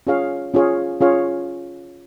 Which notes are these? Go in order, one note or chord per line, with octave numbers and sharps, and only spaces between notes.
C#4 F4 G#4 C#5 F5
C#4 F4 G#4 C#5 F5
C#4 F4 G#4 C#5 F5